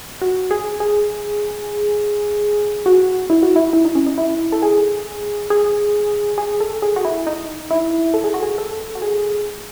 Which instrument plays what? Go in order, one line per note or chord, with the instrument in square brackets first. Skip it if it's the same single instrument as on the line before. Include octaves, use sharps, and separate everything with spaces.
[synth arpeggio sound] F#4
G#4
G#4
F#4
E4
F#4
E4
E4
D#4
C#4
D#4
E4
A4
G#4
G#4
G#4
A4
G#4
F#4
E4
D#4
E4
A4
G#4
F#4
G#4
A4
F#4
G#4